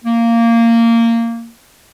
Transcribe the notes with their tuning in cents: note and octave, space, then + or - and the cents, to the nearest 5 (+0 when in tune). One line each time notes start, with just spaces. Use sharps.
A#3 -15